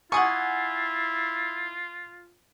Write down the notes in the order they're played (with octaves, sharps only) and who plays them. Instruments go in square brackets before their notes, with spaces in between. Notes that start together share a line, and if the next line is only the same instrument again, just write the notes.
[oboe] E4 [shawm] F4 [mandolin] F#5 G#5 [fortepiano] C#6 D#6